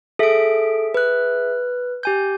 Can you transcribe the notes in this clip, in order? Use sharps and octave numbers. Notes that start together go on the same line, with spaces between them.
G#4 A4 E5 D7
B4 F#6
G4 G#5 G6